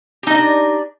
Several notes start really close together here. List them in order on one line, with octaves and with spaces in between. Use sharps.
G4 D#4 D#5 D4